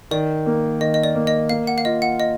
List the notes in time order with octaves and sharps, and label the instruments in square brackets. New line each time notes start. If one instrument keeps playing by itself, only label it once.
[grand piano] D#3 [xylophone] D5
[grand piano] A#3
[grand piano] D#3 [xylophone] D#5
[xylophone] D#5
D5
[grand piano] A#3
[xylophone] D#5
[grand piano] A#3 [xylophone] F5
[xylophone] F#5
F5
[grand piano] F4 [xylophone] D#5
[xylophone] F#5
D#5